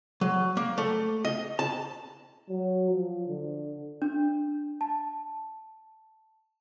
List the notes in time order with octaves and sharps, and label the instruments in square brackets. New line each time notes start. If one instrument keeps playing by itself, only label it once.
[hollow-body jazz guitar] F#3
A#3
A3
D#5
A5
[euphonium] F#3
F3
D3
[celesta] D4
A5